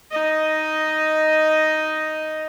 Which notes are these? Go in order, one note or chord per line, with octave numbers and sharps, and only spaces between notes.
D#4 D#5